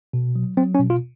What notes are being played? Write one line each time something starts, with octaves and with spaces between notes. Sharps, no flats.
B2
F#3
F#3 C4
C#4
B2
F4